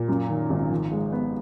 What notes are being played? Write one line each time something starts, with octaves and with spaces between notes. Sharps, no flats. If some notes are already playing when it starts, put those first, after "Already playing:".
Already playing: A#2
F#2
D#3
G#1
F3
G#3
B3